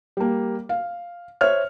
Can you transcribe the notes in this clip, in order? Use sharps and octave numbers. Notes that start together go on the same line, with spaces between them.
G3 A#3
F5
C5 C#5 E5 F6